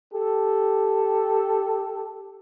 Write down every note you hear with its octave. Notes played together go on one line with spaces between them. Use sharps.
G4 A4